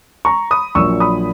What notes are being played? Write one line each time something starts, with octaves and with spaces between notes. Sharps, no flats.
A#5 C#6
B5 D#6
A#1 A#2 F#3 C#6 E6
B5 D#6